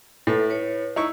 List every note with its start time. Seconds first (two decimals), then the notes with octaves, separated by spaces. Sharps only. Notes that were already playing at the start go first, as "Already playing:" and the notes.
0.27 A2 A4 B4 E5
0.50 B4 C#5
0.96 D#4 E4 C#6 E6